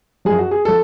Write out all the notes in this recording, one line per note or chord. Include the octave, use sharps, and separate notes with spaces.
F#2 F3 G#4
F#4
G#4
F3 A4